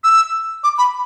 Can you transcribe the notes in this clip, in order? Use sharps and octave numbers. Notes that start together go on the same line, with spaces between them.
E6
D6
B5